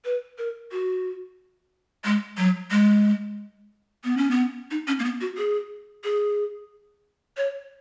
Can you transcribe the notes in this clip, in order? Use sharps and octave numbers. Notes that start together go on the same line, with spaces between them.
B4
A#4
F#4
G#3
F#3
G#3
B3
C#4
B3
D#4
C#4
A#3
B3
F#4
G#4
G#4
C#5